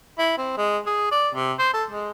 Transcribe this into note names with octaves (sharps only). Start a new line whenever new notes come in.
E4
C4
G#3
G#4
D5
C3
C5
A4
G#3